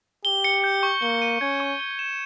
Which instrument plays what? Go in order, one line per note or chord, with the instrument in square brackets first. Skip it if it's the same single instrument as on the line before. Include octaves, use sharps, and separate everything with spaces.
[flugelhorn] G4 [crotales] G7
[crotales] C#7
G6
C#6
[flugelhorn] A#3 [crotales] G7
[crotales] D#7
[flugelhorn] C#4 [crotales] G#6
[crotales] C#6
G7
E7